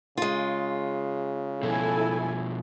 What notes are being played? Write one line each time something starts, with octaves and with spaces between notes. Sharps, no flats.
C#3 G#3 F4
B2 F3 E4 A4 G#5